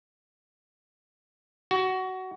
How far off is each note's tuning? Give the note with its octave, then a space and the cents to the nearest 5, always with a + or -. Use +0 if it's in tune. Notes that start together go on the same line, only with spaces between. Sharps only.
F#4 +15